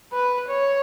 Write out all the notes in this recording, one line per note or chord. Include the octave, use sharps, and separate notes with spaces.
B4
C#5